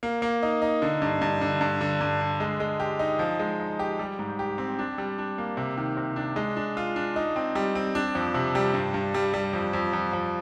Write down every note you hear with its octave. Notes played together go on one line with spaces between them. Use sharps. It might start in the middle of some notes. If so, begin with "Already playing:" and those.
A#3
A#3
D#4
D#4
D3
G2
G2
D3
G2
D3
G2
D3
G#3
G#3
G4
D#4
F3
G#3
D#4
G4
G3
G#2
G4
C4
D4
G3
D4
A#3
C3
D#3
C3
D4
G#3
D4
F4
D4
D#4
C4
G3
C4
D4
F2
C3
G3
G2
G2
G3
G3
F2
F2
F2
F2